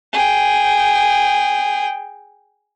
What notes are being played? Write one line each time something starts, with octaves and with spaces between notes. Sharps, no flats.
G#4 G5